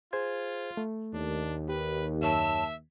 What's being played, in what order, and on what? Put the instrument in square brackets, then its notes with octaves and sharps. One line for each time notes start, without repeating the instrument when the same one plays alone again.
[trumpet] F4 [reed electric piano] G#4 C5 G#6
[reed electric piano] A3
[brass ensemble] D#2 [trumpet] D4
[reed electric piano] G4 [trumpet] B4
[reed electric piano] F#2 C#5 E6 [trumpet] E5 [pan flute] A5